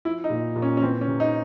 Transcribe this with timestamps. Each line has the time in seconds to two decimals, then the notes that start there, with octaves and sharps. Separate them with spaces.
0.05 F3 E4
0.24 D#4
0.30 A#2
0.56 A#2
0.62 C#4
0.77 C#4
0.82 E3 C4
1.01 C#4
1.07 C3
1.20 D#4